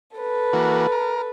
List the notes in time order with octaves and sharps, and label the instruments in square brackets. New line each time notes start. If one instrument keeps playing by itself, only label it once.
[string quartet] A4 B4
[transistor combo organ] E3 A#3 F#4
A#4